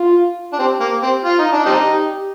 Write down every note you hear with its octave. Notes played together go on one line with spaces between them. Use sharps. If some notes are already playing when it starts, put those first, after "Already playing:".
Already playing: F4
D4
C4 G4
A#3
C4
F4
D#4
D4
G3 C4 D#4
G4